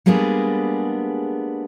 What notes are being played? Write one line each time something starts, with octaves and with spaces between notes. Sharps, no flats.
G3 G#3 A#3 B3 D4 G#4